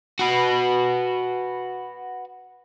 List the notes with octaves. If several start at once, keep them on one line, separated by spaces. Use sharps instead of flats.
F#4 B4